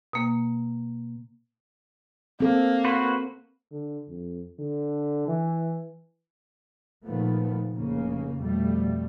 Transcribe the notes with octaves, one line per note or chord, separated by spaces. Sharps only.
B2 A#3
A#3 C4 A4
F#4 B4 C5
D3
F2
D3
E3
A#2 D#3 F3 A3 B3
F1 C#3 A#3
F2 B2 G3 A3